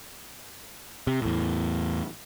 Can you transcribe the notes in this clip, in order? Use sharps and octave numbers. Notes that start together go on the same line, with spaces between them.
C3
E2 A2